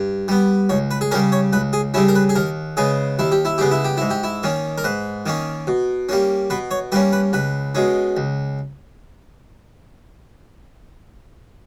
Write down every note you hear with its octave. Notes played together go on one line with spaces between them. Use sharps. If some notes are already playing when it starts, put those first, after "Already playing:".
Already playing: G2
G3 B3
C#2 C#5
B4
G#4
C#3 G3 C#4 A#4
C#5
C#2 B4
G#4
C#3 G3 C#4 E4
A#4
B4
G#4
D#2 A#4
C#3 G#3 B3 G#4
D#2 E4
G4
E4
C#3 G#3 B3 G4
E4
G4
G#2 E4
G4
E4
D#3 A#3 C#4
A#4
G#2 B4
D#3 A#3 C#4
B2
G3 A#3 C#4
B2 B4
C#5
G3 A#3 C#4 B4
B4
C#2 B4
B2 G#3 C#4
C#2